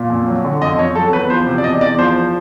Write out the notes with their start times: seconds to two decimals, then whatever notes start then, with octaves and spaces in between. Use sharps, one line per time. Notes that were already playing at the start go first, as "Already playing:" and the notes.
Already playing: A#2
0.10 F2
0.28 F#3
0.45 D3
0.61 F2 D#5
0.78 F2 C#5
0.95 F#3 A4
1.13 E2 B4
1.30 F3 C5
1.46 C3
1.58 D5
1.64 E2 D#5
1.81 E2 D5
1.98 F3 C5